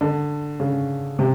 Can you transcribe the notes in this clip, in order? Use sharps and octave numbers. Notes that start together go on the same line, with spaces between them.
D3
C#3
C3